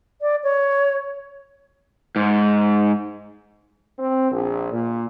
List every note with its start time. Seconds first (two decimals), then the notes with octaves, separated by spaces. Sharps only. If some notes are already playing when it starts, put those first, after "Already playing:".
0.22 D5
0.44 C#5
2.16 G#2
3.99 C4
4.32 A#1
4.72 A#2